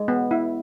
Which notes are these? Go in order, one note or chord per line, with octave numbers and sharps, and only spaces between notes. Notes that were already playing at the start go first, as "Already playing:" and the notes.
Already playing: G#3
B3
E4